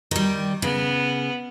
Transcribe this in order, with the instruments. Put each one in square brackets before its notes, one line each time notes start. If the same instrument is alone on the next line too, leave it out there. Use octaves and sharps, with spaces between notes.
[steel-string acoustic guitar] D#3 G3
[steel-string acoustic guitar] C#3 [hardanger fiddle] B3